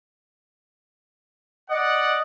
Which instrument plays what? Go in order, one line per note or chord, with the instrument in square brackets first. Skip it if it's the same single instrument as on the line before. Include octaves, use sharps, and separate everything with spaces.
[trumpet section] D5 F#5 [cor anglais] D#5